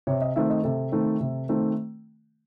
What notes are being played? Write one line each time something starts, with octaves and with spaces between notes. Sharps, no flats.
C3 C#5
D#5
D#3 A3 C4 E5
D#5
C3 A4
D#3 A3 C4
C3
D#3 A3 C4